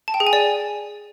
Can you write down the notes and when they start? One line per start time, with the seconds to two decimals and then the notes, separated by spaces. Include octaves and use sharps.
0.08 A5
0.14 G5
0.20 G#4
0.27 G#5
0.33 D5